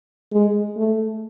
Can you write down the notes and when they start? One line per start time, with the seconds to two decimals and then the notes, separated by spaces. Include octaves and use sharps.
0.33 G#3
0.77 A3